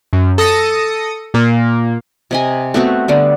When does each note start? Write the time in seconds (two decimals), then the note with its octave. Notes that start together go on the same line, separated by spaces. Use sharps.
0.13 F#2
0.38 A4 D#6 A#6 C#7
1.34 A#2 A#3
2.31 C3 D#5 G#5
2.74 A3 B3 C4 F#4
3.08 D3 G3 B3